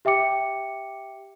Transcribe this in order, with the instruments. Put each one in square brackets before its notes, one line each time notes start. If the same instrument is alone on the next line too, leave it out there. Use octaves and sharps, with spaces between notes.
[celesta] G4 E5 G5 D6 C#7